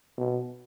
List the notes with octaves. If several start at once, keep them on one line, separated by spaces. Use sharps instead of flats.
B2